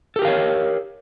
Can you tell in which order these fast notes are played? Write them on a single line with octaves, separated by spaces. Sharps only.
A4 G4 A#4 F5 C#5